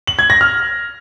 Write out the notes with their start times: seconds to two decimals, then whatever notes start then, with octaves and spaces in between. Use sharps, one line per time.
0.07 F#7
0.19 G#6
0.30 A#6
0.41 F6